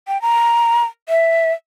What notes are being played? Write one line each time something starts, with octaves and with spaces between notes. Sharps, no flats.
G5
A#5
E5